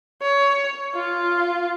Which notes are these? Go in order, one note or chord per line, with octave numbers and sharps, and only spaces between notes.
C#5
F4